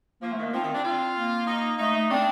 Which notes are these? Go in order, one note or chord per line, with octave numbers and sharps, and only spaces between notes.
F3 A#3
A3
D#3
A#3
F3 C4
D#3
D4
F4
A#3
D#4
A3 D#4
A3
C4 D4